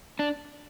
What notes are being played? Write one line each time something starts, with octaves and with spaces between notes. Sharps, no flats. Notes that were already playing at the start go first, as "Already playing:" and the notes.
D4